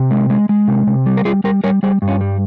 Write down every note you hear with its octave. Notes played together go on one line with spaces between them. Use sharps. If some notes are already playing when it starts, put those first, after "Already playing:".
Already playing: C3
G#3
G#3
G#3
C3
C3
G3
A#4
G3 F4 G#4
G3 G4 A#4
G3 A#4 C#5
G3 G#4 C5
G2
C#4 F4
G3